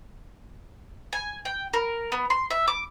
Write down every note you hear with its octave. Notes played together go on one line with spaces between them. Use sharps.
G#5
G5
A#4
B3
C6
E5
D6